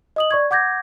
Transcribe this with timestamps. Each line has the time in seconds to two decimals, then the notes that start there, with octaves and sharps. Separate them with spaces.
0.16 D#5 D#6 F#7
0.31 D5 C#6 G#6
0.51 F#5 D6 G6 G#6 A#6